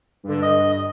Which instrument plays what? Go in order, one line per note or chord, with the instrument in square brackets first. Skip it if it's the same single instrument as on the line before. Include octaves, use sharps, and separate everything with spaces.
[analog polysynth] G2 D3
[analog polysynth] G2 [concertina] D#5